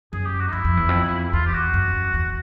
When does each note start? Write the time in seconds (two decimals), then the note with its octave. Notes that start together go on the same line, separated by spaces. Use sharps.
0.13 F#2 G#4
0.26 G4
0.40 F#4
0.48 D#4
0.52 F#2 E4
0.65 F2
0.77 E2
0.89 F2
1.33 E2 F4
1.46 G4
1.53 F#4
1.74 F#2
2.14 E2